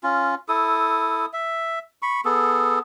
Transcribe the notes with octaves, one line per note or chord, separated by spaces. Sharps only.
C#4 F4
E4 A4 D#6
E5
B5 C#6
B3 G#4 A4